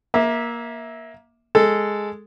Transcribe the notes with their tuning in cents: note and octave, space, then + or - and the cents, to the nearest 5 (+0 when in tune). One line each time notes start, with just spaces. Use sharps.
A#3 +15 E5 -15
G#3 +0 A4 +0